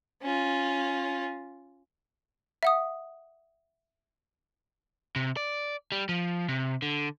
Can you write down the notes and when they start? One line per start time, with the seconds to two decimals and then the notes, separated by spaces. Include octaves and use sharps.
0.22 C#4 F4
2.63 E5 F#5 D#6
5.16 C3
5.37 D5
5.92 G3
6.09 F3
6.48 C3
6.82 D3